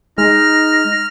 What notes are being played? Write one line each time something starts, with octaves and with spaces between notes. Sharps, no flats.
G#3 D#4 F6 A#6